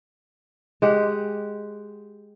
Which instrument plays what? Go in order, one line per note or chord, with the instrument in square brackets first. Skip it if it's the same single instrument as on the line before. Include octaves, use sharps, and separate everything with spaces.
[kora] G#3 G4 F#5